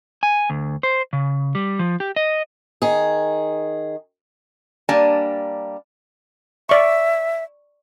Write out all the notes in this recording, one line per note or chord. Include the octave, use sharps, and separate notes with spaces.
G#5
D2
C5
C#3
G3
F3
G4
D#5
D#3 G#4
G3 A#3 D4 G#5 A5
D5 E5 C#6